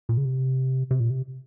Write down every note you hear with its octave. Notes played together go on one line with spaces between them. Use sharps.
A#2
C#3
C3
C3
A#2
C3